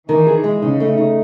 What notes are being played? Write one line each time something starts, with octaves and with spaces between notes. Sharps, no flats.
D#3 E3
G#4
G#3
C#3 D#4
A3
D#4